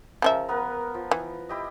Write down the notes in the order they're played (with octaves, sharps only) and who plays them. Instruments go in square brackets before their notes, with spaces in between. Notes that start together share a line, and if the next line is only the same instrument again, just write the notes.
[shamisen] C#3 F3 E5 [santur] A#4
[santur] B3 A#4 B4
F3
[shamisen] E3
[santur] E4 G4 D#5